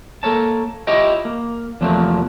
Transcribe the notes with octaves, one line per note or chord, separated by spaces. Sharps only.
A#3 A4 A#4 C#5 A5
E4 F4 G4 C#5 D#5 G5
A#3
E2 C3 F3 F#3 A3 A#3